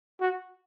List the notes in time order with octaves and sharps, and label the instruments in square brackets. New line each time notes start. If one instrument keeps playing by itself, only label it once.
[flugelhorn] F#4